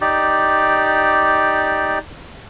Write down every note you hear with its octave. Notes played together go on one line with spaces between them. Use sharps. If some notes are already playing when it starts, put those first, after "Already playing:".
D#4 G4 D5